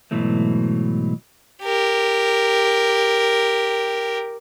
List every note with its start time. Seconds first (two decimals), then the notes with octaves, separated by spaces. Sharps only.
0.11 G#2 B2 E3 F#3 A3
1.62 G4 A#4